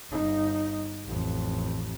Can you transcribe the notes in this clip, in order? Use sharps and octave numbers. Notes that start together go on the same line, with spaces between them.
G1 D#4
A1 F2